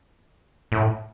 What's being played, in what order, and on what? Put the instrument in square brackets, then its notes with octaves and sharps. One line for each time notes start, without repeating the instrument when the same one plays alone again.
[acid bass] A2